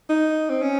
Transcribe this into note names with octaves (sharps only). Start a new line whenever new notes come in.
D#4
C4
C#4